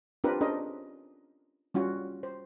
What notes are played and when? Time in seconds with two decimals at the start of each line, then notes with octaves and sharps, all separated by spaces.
0.24 C4 D4 F4 G4 A#4 B4
0.41 C#4 D4 G#4 A#4 C5 D#5
1.74 G3 C#4 F4 F#4
2.23 C5